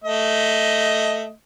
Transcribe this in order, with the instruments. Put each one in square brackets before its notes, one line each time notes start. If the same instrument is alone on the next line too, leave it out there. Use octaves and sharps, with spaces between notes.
[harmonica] A3 D#5